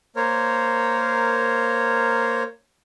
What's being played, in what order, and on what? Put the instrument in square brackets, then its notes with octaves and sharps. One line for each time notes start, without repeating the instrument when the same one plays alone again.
[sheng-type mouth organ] A#3 A#4 C5 C#5